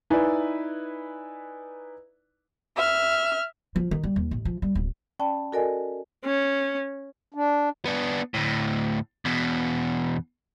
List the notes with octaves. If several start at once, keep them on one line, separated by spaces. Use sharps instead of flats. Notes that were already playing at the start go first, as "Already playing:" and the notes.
D#4 E4 B4 D5 G#5
E5 F6
F3
D#3
G3
D#2
A1
F3
G3
D1
C#4 D5 G5 A5 B5
F#4 A4 A#4 D5 D#5 G#5
C#4
D4
B3 D4
D2 A2
E2 B2